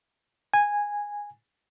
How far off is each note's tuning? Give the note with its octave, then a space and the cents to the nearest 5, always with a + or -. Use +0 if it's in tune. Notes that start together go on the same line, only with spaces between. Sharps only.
G#5 -10